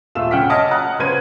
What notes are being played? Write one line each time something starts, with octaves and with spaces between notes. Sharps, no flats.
D#1 A3 F4 F5 E6 E7
C#3 F#5 G5 F6 B6
C#5 D#5 A5 D#6 F6
F#5 A#5 D#6 F#6
C#3 C#4 B4 C5 G#6 D#7